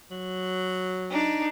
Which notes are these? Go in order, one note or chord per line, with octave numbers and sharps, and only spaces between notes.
F#3
D4 D#4